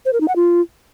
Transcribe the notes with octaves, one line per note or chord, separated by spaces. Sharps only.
C5
A#4
D#4
F#5
F4